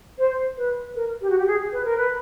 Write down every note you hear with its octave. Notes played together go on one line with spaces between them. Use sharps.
C5
B4
A#4
G4
F#4
G4
G#4
B4
A#4
B4